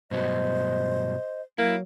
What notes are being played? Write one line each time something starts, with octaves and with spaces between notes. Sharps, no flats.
G2 B2 F#3 C5 D#5
F#3 A#3 E4